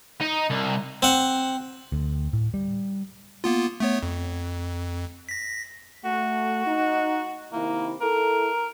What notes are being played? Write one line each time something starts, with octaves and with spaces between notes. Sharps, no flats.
D#4
C2
C4 F#5
D2
A2
G3
A#3 B3 F4
A3 B3 C#5
F2
A#6 B6
A3 F#4
D#4
C3 D#3 A#3 E4
E4 A4 A#4